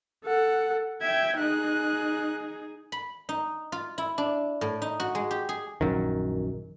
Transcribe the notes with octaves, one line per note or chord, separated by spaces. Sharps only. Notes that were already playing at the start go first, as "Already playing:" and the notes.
A4 F#5
E5 G5 G#6
D#4 G#4 F#6
B5
D#4
F4
E4
D4
A2
D#4
F#4
G#3
G4
G#4
A#1 F#2 D#3